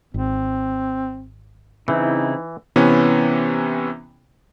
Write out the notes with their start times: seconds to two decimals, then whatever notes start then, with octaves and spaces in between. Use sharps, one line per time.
0.14 G#1 C4
1.88 C#3 E3 C4 D#4 E4
2.76 C3 E3 B3 C#4